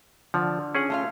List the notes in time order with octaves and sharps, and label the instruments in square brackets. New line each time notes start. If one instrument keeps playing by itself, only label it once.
[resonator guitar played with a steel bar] D3 [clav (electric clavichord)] F3
[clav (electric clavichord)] C#4 G#4 F#5
[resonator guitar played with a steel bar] A3 F4 F5